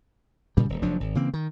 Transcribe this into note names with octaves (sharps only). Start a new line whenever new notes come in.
A#2 C#3 G3
D#1
F1 F3 F#3 D4
G#1
C#3 E3 A#3 C4
D#3